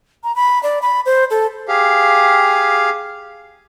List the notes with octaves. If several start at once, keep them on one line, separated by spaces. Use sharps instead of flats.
A#5
B5
D5
B5
C5
A4
G4 G#4 F5